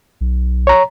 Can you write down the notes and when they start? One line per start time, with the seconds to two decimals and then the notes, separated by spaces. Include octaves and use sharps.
0.21 B1
0.67 C#5 A#5